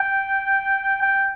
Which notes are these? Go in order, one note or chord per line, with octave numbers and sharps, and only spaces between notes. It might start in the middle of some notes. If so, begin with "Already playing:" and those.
Already playing: G5
G5